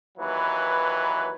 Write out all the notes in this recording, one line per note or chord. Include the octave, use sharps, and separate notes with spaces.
D#2 E3 F#3 B4